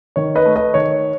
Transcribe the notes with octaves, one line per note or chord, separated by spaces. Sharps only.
D#3 C#5
B4 D#5
A3
B4 D#5
D#3 C#5